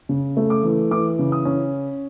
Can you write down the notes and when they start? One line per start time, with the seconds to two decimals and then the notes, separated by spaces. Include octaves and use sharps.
0.09 C#3
0.37 A3
0.50 D6
0.63 E3
0.91 E3 D6
1.19 C#3
1.32 D#6
1.45 C#4